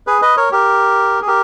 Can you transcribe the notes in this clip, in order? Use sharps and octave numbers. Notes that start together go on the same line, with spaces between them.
G#4 B4
B4 D#5
A#4 C#5
G4 A#4
G#4
G4 A#4